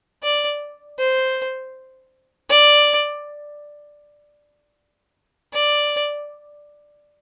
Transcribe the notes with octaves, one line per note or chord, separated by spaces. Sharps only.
D5
C5
D5
D5